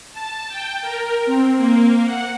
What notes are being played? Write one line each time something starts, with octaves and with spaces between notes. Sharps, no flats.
A5
G5
A#4
C4
A#3
F#5